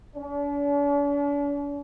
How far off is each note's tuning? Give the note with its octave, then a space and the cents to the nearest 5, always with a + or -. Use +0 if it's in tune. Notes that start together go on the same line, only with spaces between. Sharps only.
D4 -45